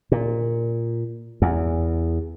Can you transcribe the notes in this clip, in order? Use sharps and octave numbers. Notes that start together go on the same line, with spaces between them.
A#2
E2